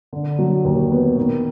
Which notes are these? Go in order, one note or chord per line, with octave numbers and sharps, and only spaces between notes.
D3
F#3
D#2
B3
D#3